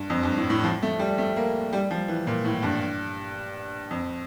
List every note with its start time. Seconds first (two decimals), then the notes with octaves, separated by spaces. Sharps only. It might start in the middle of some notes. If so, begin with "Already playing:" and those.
Already playing: G2
0.10 F2
0.23 G2
0.37 A2
0.50 A2
0.64 F3
0.83 A3
0.99 G3
1.18 A3
1.36 A#3
1.73 G3
1.91 F3
2.08 E3
2.27 A#2
2.45 A2
2.63 G2
3.91 F2